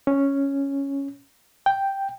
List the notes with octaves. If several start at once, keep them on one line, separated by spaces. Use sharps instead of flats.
C#4
G5